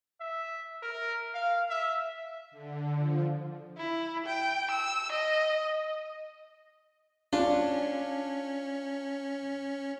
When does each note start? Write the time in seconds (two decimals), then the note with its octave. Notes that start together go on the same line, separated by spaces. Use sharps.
0.21 E5
0.83 A#4
1.34 F5
1.70 E5
2.51 D3
2.95 F3
3.77 E4
4.26 G5
4.71 E6
5.12 D#5
7.33 C#4 D4 F4